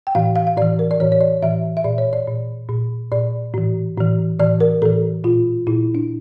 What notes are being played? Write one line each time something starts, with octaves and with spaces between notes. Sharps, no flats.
G5
A2 E3 F5
F5
F5
A2 E3 D5
A#4
D5
A2 E3 C#5
C#5
D5
A2 E3 E5
E5
A#2 D5
C#5
D5
A#2
A#2
A#2 D5
A2 E3
A2 E3
A2 E3 D5
A#4
A2 E3 A4
A#2 F4
A#2 E4
D4